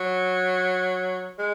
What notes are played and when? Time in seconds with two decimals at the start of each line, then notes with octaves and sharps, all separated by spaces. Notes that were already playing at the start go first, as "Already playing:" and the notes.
Already playing: F#3
1.39 G#3